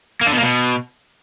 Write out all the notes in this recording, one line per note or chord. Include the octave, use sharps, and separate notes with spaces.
A#3
D3
B2
A#3
B2